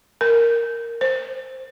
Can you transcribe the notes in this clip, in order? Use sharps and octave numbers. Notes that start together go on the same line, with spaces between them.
A#4
C5